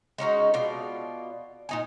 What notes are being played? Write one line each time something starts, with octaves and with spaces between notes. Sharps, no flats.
G#3 C#4 D#4 F#4
B2 F4 D5
A#2 D#4 G#5